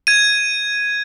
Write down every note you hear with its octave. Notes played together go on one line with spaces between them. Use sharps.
G#6 D#7